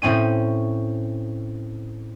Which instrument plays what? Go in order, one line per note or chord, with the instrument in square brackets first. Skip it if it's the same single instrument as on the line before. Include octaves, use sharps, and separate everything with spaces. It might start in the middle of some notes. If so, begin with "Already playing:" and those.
[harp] A2 C4 C#4 D#7